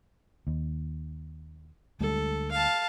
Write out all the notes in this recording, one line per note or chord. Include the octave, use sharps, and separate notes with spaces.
D#2
D2 G3 G#3 A4
F5 A5